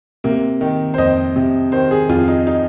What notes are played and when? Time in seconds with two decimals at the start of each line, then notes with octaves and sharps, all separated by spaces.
0.24 C3 A#3
0.61 D#3
0.94 C5
0.98 F2 D#5
1.36 C3
1.72 D#3 C5
1.91 G#4
2.09 F2 F4
2.28 D#4
2.47 D#4